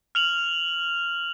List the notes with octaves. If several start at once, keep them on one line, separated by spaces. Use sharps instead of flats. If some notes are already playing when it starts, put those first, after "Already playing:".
F6 F7 F#7